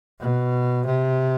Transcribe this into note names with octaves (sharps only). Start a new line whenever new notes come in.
B2
C3